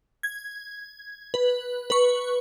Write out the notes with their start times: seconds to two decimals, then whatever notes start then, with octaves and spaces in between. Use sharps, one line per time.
0.23 G#6
1.34 B4
1.90 B4 C#6